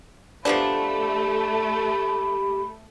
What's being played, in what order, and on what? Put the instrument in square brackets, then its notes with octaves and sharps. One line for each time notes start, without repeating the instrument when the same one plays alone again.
[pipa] F3 B3 D4 [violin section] A3 [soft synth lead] G4 [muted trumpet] B5